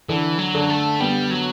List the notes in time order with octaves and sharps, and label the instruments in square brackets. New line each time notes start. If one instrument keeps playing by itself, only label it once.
[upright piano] D3 [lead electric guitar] E3
[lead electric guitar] F#3
[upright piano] D3
[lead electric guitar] A3
[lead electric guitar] G3 [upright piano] B3
[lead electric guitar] F#3